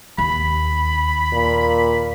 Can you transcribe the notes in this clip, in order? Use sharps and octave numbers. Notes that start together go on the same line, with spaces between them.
D#2 B5
A#2